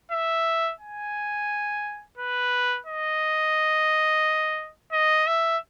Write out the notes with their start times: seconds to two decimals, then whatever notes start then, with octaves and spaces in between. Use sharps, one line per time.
0.11 E5
0.80 G#5
2.17 B4
2.86 D#5
4.93 D#5
5.27 E5